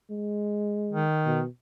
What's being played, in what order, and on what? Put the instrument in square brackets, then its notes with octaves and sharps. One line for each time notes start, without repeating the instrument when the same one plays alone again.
[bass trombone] G#3
[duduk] D#3
[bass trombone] B2